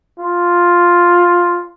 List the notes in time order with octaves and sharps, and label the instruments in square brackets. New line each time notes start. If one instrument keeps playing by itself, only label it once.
[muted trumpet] F4